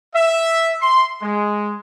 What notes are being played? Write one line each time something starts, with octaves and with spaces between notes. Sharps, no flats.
E5
C6
G#3